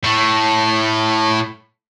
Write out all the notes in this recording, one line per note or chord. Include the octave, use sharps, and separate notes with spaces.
A2 A3